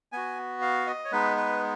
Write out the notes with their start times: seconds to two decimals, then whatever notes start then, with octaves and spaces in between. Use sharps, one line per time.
0.12 B3 F#4 G#5
0.62 F5
0.87 D#5
1.05 C#5
1.12 G#3 B3 D#4 B4
1.37 B4